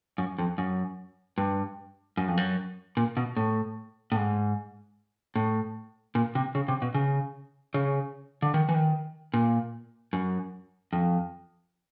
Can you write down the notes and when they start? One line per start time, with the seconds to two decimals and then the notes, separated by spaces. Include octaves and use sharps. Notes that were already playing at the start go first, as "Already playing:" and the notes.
0.18 F#2
0.39 F2
0.58 F#2
1.38 G2
2.17 F#2
2.28 F2
2.37 F#2
2.97 A#2
3.17 B2
3.37 A2
4.12 A2
4.17 G#2
5.36 A2
6.15 A#2
6.35 C3
6.55 C#3
6.68 C3
6.82 B2
6.94 C#3
7.74 C#3
8.42 D3
8.54 D#3
8.69 E3
8.74 D#3
9.34 A#2
10.13 F#2
10.93 F2